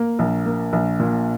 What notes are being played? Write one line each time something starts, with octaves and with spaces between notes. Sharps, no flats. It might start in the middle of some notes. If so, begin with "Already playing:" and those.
Already playing: A#3
A#1
A#3
A#1
A#2